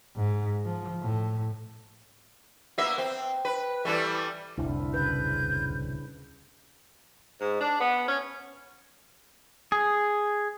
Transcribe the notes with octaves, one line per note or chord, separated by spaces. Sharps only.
G#2
F3
A2
A#3 B3 E5
C4
B4
E3 G3 A3
D1 C2 F2 D4 E4
C#3 B4 G6
G#2
D4
B3
C#4
G#4